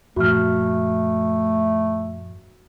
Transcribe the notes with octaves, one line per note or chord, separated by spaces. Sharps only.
F#2 A#2 F3 A3 F#4 F6